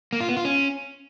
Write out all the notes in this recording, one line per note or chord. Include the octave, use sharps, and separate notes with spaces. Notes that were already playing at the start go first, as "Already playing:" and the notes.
A#3
F4
B3
F4
C#4